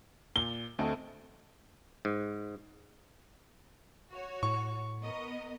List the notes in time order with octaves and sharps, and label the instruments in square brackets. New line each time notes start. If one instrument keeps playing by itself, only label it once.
[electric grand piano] A#2 [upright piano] G7
[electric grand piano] D2 C4 D#5 [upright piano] A3
[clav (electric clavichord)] G#2
[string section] F#4 C#5
[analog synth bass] A2 [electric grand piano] C#6
[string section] B3 A#4 D#5